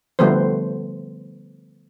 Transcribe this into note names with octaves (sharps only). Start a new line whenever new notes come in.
D3 F3 G3 A3 B3 C5